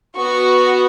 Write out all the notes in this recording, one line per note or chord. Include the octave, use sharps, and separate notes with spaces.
B3 F#4 C#6